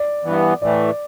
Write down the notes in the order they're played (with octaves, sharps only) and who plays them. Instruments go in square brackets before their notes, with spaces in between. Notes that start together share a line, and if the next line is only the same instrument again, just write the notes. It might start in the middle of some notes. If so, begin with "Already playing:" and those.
Already playing: [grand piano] D5
[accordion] G2 E3 B3
[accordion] A2 E3 A3 [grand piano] D5